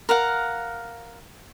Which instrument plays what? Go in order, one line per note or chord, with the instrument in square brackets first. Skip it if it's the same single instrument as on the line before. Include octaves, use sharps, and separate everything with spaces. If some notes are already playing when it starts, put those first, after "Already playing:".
[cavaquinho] A#4 F5 F#5